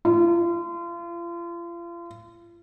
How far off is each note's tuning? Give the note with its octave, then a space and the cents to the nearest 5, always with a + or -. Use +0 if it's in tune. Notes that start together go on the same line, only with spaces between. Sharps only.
F4 -35